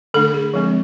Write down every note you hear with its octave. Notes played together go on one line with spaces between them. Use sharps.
D3 A3 D4 A4
G#4
F3 G#3 C4